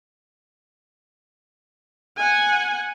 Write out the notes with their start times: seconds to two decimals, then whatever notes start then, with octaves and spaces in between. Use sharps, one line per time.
2.17 F#5 G#5